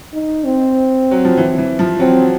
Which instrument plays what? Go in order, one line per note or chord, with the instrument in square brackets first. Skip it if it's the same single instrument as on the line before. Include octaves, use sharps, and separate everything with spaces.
[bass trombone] D#4
C4
[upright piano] F#3
F3
E3
E3
F3
[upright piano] F#3 [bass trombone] C4